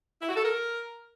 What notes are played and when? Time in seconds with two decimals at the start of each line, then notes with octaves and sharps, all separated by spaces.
0.22 E4
0.29 F#4
0.36 A4
0.43 A#4